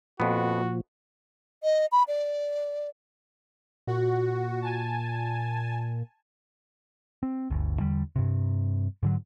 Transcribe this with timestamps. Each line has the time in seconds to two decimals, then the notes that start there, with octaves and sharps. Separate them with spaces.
0.20 F2 A#2 F3 B3 F#4
1.63 D#5
1.92 B5
2.08 D5
3.87 A#2 F#4
4.62 G#5 A5
7.23 C4
7.50 G1 D2
7.80 E2 D3 G3
8.16 G2 C3
9.03 G#2 D3 F#3